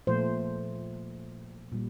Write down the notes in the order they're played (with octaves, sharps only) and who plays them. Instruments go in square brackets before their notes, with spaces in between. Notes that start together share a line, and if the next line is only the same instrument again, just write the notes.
[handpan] A#2 F3 A3 C5
A#2 G3